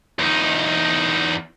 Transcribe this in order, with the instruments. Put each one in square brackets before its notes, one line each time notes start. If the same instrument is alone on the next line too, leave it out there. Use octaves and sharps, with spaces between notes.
[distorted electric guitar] E2 D#4